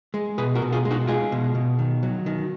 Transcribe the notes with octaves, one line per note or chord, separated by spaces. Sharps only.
G#3
B2 G#4 B4
F#4 A#4
B2
F4 G#4
G#3
D#4 F#4
G#3 F4 G#4
B2
B2
D#3
F#3
D#3